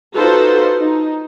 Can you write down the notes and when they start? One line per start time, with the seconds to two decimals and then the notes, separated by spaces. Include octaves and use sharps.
0.16 D#4 F4 F#4 A4 B4 C5
0.80 D#4